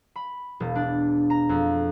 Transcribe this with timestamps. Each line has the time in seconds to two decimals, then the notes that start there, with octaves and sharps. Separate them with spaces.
0.16 B5
0.60 E1
0.75 D4
1.30 A#5
1.49 F2